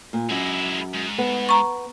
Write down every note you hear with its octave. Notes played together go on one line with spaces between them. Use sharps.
A#2
F#2 G#3 E4
G#2
B3
A#5 C#6